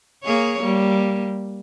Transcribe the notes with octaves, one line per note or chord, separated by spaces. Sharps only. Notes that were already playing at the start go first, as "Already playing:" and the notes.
A#3 G#4 C#5
G3 A#3